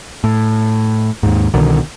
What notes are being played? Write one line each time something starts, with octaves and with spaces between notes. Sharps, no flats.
A2
D#2 G#2
C2 B2 D3 D#3